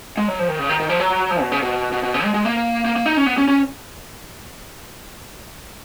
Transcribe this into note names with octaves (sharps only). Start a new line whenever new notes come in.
G#3
F#3
F3
D#3
C#3
D#3
D#3
F3
F#3
F3
B2
C#3
B2
B2
B2
C#3
G#3
G#3
A#3
A#3
A#3
D#4
C#4
B3
C#4
C#4